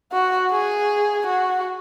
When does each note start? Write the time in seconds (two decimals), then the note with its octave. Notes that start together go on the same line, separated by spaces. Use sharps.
0.13 F#4
0.51 G#4
1.27 F#4